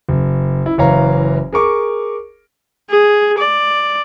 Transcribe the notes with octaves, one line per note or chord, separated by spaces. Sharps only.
F#1
E4
F#1 E3 C#5 F5 A#5
G#4 A#4 C#6 D6
G#4
D5